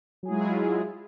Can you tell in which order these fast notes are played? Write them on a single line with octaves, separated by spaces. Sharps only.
F#3 G#4 E4 G#3 F4